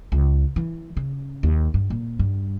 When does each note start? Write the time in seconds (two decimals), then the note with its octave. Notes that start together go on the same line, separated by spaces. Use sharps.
0.12 C#2
0.56 E3
0.97 C#3
1.43 D#2
1.74 G2
1.90 A#2
2.19 G2